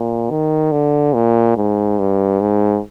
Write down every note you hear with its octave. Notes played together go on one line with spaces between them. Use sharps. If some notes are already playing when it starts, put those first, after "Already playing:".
Already playing: A#2
D#3
D3
A#2
G#2
G2
G#2